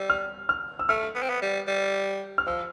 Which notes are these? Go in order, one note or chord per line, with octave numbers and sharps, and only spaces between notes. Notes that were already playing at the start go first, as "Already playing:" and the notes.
Already playing: G3 E6
F6
F6
E6
A3 F6
B3
C4
B3
G3
G3
F6
F3 E6